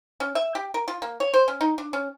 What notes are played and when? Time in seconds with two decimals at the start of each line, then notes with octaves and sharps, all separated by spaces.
0.20 C#4
0.35 E5
0.55 G4
0.74 A#4
0.88 F4
1.02 A#3
1.20 C#5
1.34 C5
1.48 C#4
1.61 D#4
1.78 D4
1.93 C#4